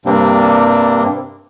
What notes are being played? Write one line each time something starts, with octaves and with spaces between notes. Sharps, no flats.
G2 C3 G3 A#3 C4 D4